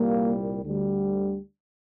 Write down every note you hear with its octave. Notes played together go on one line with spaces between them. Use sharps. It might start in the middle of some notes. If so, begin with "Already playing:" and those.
Already playing: C2 A#2 G3 A#3
D2 D3 G3